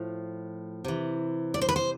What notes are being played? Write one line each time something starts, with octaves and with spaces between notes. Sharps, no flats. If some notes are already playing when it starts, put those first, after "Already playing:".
Already playing: A2 F3
C3 E3
D5
C5
B4
C5